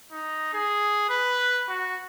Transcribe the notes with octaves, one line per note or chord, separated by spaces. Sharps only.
D#4
G#4
B4
F#4